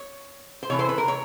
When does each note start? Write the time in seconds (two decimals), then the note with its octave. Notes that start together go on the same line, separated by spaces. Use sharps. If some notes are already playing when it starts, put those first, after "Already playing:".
Already playing: C#5
0.63 C5
0.69 C3 E3 A3 C#5
0.79 C5
0.89 B4
0.98 A#4
1.08 C#5